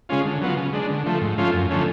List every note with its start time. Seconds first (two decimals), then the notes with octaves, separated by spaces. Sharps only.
0.09 C#3 G#3 C#4 F4
0.25 D3
0.41 F#3 B3 F4
0.57 C#3
0.73 G#3 D4
0.90 D3
1.06 F3 A3
1.21 G#2
1.38 F3 A3 C#4 F4
1.54 F#2
1.71 D3 F3 A3 C#4